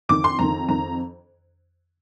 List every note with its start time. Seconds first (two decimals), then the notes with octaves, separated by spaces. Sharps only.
0.09 F2 D#3 D6
0.24 C6
0.39 F2 D#3 A#5
0.68 F2 D#3 A#5